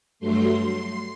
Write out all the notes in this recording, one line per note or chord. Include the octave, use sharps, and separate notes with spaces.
G2 F#3 A3 C6